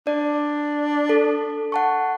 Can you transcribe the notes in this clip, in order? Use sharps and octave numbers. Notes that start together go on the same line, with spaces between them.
D4 D5
A4
F#5 A5 C#6